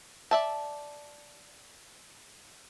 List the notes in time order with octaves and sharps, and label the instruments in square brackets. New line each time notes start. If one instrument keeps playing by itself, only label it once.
[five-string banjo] D5 E5 A5